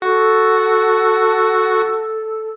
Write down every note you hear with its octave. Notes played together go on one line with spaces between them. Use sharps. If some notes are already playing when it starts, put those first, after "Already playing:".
F#4 A4